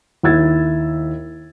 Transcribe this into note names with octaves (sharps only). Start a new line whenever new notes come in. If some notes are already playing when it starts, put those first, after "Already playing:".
D#2 E4 E6 G#6 A6